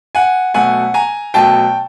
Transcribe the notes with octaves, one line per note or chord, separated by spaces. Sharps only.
F#5 G#5
B2 F#3 A3 F#5 G#5
G#5 A#5
B2 F#3 A3 G5 A5